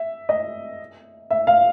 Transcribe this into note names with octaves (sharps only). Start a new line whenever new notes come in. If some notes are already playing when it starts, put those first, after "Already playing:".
Already playing: E5
D#5
E5
F5